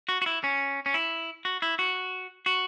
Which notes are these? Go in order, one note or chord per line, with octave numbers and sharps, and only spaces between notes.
F#4
F#4
E4
C#4
C#4
E4
F#4
E4
F#4
F#4